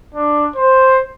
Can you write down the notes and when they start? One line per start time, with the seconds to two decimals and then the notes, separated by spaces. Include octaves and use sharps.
0.14 D4
0.56 C5